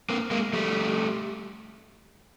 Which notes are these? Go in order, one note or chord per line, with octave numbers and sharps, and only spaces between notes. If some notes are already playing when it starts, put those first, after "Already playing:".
A#3 C4
G#3 A#3
G3 A3